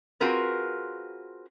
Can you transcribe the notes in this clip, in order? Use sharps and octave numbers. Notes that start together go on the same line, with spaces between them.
C4 F4 F#4 G#4 A#4 B4